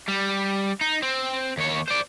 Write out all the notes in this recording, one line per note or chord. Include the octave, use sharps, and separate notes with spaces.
G3
D#4
C4
D#2 C#5
C5 D5